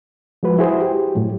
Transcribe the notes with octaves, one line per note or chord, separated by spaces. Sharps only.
F3 G#3 F#4 B4
E4 F#4 G#4 C5
G4
A2 F#3